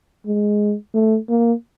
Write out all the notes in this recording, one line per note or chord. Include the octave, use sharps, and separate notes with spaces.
G#3
A3
A#3